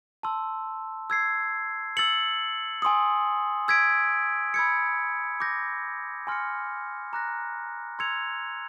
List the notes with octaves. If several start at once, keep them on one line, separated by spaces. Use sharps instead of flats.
A5 C6 E6
E6 G#6 C7
E6 A6 C#7 F#7
G#5 C6 D#6
E6 G#6 B6 D7
B5 E6 G#6 C#7
D6 G6 A#6
G#5 C6 F6 A#6 C#7
A#5 D6 F#6 A#6
C6 E6 G#6 C#7 F7